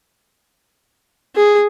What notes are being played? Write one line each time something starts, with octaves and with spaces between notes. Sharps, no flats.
G#4